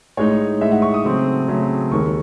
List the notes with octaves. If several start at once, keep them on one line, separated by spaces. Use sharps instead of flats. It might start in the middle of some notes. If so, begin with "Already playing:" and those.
A2 G#3 D#4 C#5
A2 G#3 D#4 E5
F#5
C#6
D#6
C#3 F#3 A3 C4
C#3 F#3 A3 C4
D#2 D#3 G#3 C#6